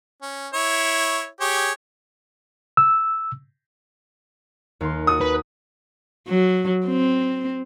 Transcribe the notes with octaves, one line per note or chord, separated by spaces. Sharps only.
C#4
E4 C#5
G4 G#4 C#5
E6
D#2 F5 C6
F#4 D#6 F#6 A6
B4
F#3
C4